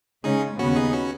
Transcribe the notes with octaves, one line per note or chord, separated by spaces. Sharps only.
C#3 G#3 C#4 D#4 G#4
D#2 C#3 B3 C#4 F#4
D#4 G#4
C#4 F#4